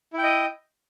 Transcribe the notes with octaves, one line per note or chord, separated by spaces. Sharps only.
E4 D#5 G5